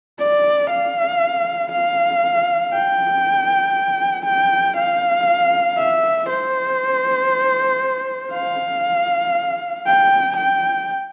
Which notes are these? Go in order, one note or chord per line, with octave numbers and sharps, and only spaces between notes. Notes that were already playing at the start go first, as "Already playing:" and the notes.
D5
F5
F5
G5
G5
F5
E5
C5
F5
G5
G5